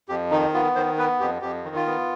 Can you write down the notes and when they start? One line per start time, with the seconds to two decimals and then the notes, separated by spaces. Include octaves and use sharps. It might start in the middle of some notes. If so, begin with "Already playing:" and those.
0.09 F2 G4
0.31 D#3 D#4
0.54 B3 F4
0.76 D#3 C5
0.98 B3 B4
1.20 F2 G4
1.42 F2 G4
1.65 D#3
1.76 F4
1.87 B3